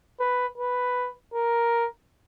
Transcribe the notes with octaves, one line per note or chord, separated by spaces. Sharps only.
B4
B4
A#4